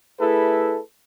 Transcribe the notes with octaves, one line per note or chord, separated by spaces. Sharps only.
A3 E4 G#4 A4 B4